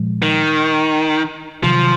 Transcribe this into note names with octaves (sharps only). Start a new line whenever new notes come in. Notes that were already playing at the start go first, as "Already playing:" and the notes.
Already playing: A#2 F3 G#3
D#3
C3 D#3 F3 F#3